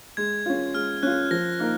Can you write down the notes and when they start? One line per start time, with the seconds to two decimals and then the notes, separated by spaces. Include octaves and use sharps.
0.17 G#3 G#6
0.46 C#4 F4
0.74 G#3 F6
1.03 C#4 F#6
1.07 F4
1.31 F3 A#6
1.59 A#3 D#4 A#4